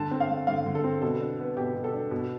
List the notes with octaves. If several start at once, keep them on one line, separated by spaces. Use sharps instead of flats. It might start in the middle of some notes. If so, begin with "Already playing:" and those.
Already playing: D3 A5
C4
F5
A3
D3 F5
D3
A4
C4
B2 A4
D4
B3
B2 G4
B2
A4
D4
B2